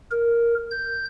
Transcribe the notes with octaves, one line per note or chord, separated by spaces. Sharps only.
A#4
G6